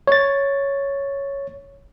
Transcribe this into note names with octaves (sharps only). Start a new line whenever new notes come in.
C#5 A6